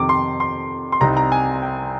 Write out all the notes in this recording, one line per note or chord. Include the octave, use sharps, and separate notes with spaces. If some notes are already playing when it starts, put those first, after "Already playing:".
Already playing: F2 C3 D#3 D6
C6
C6
C6
C2 C3 G3 C4 D#4 A#5
A#5
G#5
G5